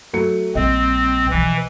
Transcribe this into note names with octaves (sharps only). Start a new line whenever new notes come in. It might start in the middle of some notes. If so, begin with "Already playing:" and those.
F#3 A3 C#7
A#1 G3 C4 D#5
B1 E3 F3